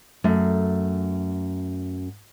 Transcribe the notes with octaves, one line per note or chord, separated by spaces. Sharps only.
F#2 A3